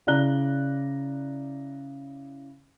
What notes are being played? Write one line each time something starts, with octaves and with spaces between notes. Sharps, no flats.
C#3 E4 D5 A#5 F#6 G7